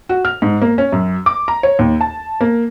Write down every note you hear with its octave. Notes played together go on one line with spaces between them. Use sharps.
F#4
F6
G#2
A#3
C#4
F#2
D6
A#5
C#5
D#2
A5
A#3